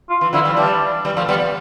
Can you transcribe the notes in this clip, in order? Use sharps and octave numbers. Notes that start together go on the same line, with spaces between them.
F4
E3
D3 F3 E4
E3 G3
E3 G3 D4
E3 G3
F3 A3
G3 B3